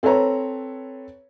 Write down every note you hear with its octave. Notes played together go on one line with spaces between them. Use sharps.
C4 A4 B4 C#5 A#5